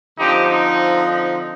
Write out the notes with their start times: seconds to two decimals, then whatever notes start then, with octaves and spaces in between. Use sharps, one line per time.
0.18 D3 F3 C4 D#4 G4
0.50 D#4
1.11 D#4